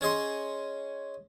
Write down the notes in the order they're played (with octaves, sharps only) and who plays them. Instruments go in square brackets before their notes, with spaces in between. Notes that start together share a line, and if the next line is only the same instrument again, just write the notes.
[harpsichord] C#4 G#4 D#5 C6